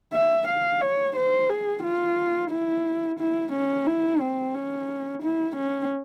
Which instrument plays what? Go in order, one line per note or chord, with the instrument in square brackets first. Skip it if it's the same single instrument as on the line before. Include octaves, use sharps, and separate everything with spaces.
[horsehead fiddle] E5
F5
C#5
C5
G#4
F4
E4
E4
C#4
E4
C4
C#4
E4
C#4